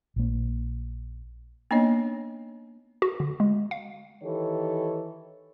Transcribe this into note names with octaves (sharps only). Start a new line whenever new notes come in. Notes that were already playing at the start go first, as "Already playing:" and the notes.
A#1 A#3
A#3 B3 D4 D#4 C#5 D#5
F#4
D3
G#3
F5
D#3 E3 G4 A4 C#5